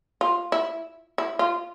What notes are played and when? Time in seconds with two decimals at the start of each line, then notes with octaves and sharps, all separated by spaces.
0.21 F4
0.52 E4
1.18 E4
1.39 F4